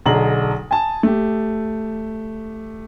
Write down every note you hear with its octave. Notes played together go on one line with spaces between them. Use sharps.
B1 D3 G#4 A#5 F#7
G#5 A5
A3 G4